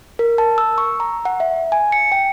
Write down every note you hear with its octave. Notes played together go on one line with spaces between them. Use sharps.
A#4
A5
E6
C#6
A#5
F#5
E5
G#5
C#7
G5